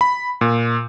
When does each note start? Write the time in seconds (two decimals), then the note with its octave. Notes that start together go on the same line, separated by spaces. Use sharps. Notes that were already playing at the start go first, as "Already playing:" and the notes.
0.01 B5
0.41 A#2